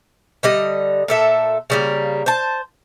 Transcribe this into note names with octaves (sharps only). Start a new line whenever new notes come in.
D3 G3 D#5
A#2 A4 E5
C#3 G3 A#3
C5 A5